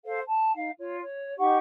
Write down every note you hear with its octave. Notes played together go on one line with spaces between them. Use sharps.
A4 C5 F5
A5
D#4 F5
F4 C#5
C#5
D#4 G4 F#5 C#6